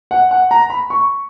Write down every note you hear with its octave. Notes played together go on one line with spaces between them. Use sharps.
F#5
F#5
A#5
B5
C#6